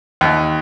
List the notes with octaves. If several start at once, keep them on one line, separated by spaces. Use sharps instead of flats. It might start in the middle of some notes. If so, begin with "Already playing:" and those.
D#2